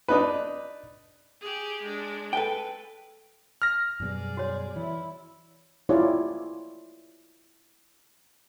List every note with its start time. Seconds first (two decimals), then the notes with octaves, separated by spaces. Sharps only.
0.08 D4 D#4 B4
1.41 G4 G#4
1.83 G#3 D4
2.33 A4 B4 G5
3.62 F6 A#6
4.00 F#2 B2 G3 G#4 D5
4.37 F#4 C#5
4.76 E3 E4
5.89 E4 F4 G4 C#5 D5